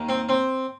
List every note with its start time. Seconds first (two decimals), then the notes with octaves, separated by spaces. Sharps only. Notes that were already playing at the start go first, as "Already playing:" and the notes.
Already playing: D#2 D#3 A#3
0.09 C4
0.29 C4